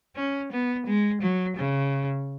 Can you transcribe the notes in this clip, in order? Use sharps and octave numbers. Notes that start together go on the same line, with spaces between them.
C#4
B3
G#3
F#3
C#3